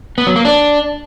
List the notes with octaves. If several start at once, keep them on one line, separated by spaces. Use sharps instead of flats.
B3
F#3
A#3
D4